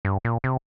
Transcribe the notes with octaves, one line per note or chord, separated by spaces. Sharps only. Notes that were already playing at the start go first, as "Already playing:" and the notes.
G2
A#2
C3